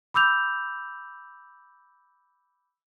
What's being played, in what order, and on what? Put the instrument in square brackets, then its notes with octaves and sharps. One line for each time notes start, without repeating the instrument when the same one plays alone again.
[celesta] B5 D6 E6 G6 F7